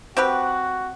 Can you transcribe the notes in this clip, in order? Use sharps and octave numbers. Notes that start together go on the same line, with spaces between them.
C4 F#4 G4 B4